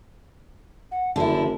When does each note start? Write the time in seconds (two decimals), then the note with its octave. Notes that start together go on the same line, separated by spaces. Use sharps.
0.91 F#5
1.16 F#1 D3 E4 A5